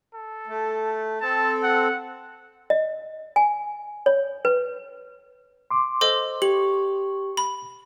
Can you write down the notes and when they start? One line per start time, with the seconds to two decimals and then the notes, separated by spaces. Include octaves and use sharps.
0.14 A4
0.47 A3
1.21 C4 A4 A5
1.63 F#5
2.70 D#5
3.36 G#5
4.06 C#5
4.45 B4
5.70 C6 D6
6.01 A4 C5 D#5
6.42 G4 F#7
7.37 B5